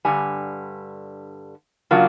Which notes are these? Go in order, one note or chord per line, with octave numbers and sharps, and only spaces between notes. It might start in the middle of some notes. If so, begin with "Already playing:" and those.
G2 D3 G3 G#5
C#3 F#3 A#3 D4 F4